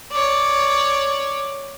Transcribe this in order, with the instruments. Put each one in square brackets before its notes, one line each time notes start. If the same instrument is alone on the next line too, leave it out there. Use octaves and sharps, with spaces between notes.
[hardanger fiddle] C#5 D5